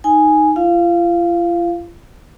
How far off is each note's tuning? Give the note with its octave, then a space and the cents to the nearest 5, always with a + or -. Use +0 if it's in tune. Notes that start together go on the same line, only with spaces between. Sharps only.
D#4 +0 G#5 +0
F4 -40 F5 -5